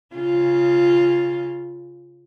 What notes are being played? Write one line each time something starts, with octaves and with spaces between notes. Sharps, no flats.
C#3 F4